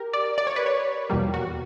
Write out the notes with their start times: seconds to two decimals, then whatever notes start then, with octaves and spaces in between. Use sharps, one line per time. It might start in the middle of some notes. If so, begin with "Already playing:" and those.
Already playing: G4 A#4
0.13 D5
0.38 D5
0.47 C#5
0.56 B4
0.66 C#5
1.10 E2 B2 G3 A#3
1.34 F#4